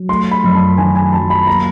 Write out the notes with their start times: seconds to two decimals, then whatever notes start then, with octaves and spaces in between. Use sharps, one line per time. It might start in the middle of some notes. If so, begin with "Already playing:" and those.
Already playing: F#3
0.09 A3 C6
0.31 B5
0.44 F#2
0.55 A5
0.78 D#3 G#5
0.95 G#5
1.13 F#3 A5
1.30 B5
1.47 A#3 A#5